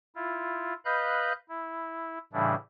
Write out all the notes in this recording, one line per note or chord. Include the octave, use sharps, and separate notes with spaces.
E4 F4
B4 D#5 F5 B5 F#6 G6
E4
A2 C#3 E3 G3 D4 E4